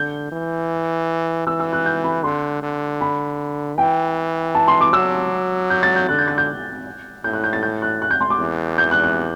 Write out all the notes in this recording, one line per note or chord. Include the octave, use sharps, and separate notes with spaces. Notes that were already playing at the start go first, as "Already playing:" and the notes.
Already playing: D3 G6
E3
E3 E6
E6
F#6
G6
B5
D3 C6
D3
B5
E3 G5
A5
C6
D6
F#3 E6
G6
A6
G6
D3 F#6
G6
A6
G6
A2 G6
F#6
G6
A6
G6
F#6
F#6
G6
C6
D6
E2
G6
F#6
F#6